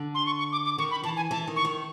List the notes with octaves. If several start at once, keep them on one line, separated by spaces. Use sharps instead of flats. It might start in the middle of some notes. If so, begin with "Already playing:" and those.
Already playing: D3
C6
C#6
C#6
D6
D6
D#3 C#6
B5
E3 A5
G#5
E3 A5
D#3
C#6
D#3